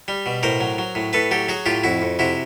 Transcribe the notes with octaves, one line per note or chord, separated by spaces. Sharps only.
G3
B2
A2 A#4 C5
F#3
F#3
A2
A2 A4 B4
F#3 G4 A4
F#3 F#4 G#4
A2 F4 G4
F2 E4 F#4
F2
C3 E4 F#4